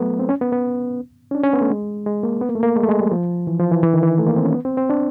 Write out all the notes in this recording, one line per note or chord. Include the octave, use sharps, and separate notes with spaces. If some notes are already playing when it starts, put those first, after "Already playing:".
Already playing: F#3 A3 B3
C4
C#4
B3
B3
C#4
D4
C#4
B3
A3
G#3
G#3
A#3
B3
A#3
A3
A#3
G#3
A3
G#3
G3
F3
E3
F3
E3
E3
D#3
E3
A3
A#3
C4
C#4
B3
C4
C4
D4